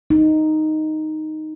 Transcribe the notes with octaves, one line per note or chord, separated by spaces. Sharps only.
D#4